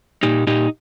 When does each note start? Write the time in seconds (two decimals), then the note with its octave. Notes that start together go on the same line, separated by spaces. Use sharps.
0.23 A#2 D#4 G4
0.47 A#2 D#4 G4